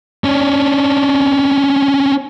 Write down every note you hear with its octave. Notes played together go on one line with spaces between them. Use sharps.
C#4 D4